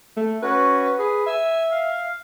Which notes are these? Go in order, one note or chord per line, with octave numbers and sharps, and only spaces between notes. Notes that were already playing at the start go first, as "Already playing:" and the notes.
A3
C#4 F#4 B4
G#4 B4
E5 G#5 E6
F5